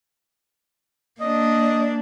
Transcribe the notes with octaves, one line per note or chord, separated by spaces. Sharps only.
A#3 D4 D#5